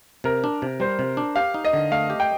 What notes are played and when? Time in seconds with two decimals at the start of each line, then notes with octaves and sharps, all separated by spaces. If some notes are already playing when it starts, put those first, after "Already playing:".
0.24 C3 A#4
0.44 D4
0.62 C3
0.80 G3 C5
0.99 C3
1.17 D4
1.36 G4 F5
1.54 D#4
1.65 D#5
1.73 D3
1.92 A3 F5
2.10 G4
2.20 G5